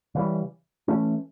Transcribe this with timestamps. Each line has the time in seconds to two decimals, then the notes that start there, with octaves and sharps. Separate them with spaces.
0.15 C#3 E3 G3
0.88 E3 A3 C#4